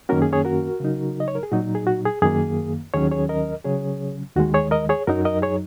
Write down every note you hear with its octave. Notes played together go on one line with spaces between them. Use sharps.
F#2 D#3 A#3 C#4 F#4 A#4
G#4
G#4 C#5
F#4 A#4
C#3 F#3 D#4
D#5
C#5
A#4
G#4
A#2 F#3 D#4 F#4
G#4
F#4
G#4
F#2 D#3 A#3 G#4
D#2 D#3 F#3 C#4 G#4 C#5
G#4 C#5
A#4 D#5
C#3 F#3 C#4 G#4 C#5
D#2 D#3 G#3 F#4
G#4 C#5
A#4 D#5
G#4 C#5
F#2 F#3 D#4 F#4 A#4
A#4 D#5
G#4 C#5